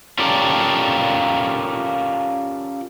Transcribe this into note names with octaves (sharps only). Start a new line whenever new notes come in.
C#4 F4 G4 A4 A#4 D5